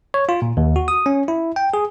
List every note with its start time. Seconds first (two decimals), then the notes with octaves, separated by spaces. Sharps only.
0.14 C#5
0.29 F4
0.42 A#2
0.57 D#2
0.76 F#4
0.88 D#6
1.06 C#4
1.28 E4
1.56 G5
1.74 G#4